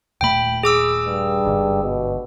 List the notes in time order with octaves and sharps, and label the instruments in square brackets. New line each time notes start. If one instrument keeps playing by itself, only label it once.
[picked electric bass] D#1 A#2 A3 [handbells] G5 B5
[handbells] G#4 D6 E6
[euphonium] G2
[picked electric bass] G1 G#2 D3
[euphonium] B2